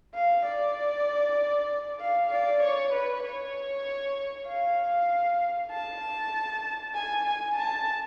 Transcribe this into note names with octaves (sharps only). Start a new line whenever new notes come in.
F5
D5
F5
D5
C#5
B4
C#5
F5
A5
G#5
G#5
A5